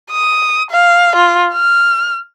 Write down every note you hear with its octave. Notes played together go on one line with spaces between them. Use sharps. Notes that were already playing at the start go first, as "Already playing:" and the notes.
D#6
F5
F4
F6